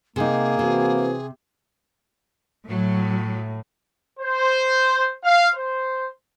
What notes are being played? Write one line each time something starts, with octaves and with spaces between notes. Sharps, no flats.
C3 A#3 D#4 G#4
C3 E3 C4 F#4
A2 F#3
C5
F5
C5